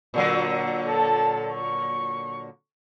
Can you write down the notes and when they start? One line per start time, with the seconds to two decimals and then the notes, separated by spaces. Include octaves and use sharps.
0.14 A#2 D3 F#3
0.87 A4 A5
1.54 C#6